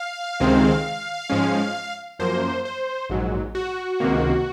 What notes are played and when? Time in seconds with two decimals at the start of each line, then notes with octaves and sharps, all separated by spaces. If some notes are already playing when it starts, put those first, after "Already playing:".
Already playing: F5
0.40 C#2 C3 D#3 G#3 C4
1.30 G#2 F3 G#3 C#4
2.19 F#2 F3 A#3 C5
2.65 C5
3.10 A#1 G#2 F#3
3.55 F#4
4.00 C#2 C3 D#3 A#3